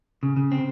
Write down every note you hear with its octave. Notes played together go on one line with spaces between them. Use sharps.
C#3
C#3
C4